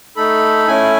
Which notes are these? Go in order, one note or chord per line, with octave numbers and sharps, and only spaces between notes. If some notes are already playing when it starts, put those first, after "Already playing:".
A3 D#4 A4 B5
A3 C#4 E4 G#5